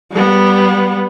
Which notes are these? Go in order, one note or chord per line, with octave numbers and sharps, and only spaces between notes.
G3 B3